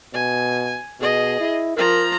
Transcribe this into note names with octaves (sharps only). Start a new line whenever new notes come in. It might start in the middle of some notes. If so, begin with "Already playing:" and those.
B2 G#5
B2 G#4 D#5
E4
F3 A#4 A#5